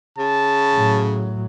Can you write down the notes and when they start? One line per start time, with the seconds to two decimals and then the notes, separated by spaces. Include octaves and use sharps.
0.18 C#3 A5
0.74 A2 F#3